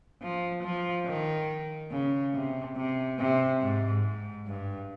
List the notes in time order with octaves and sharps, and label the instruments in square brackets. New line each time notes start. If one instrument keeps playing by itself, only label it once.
[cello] F3
F3
D#3
C#3
C3
C3
C3
G#2
G#2
G2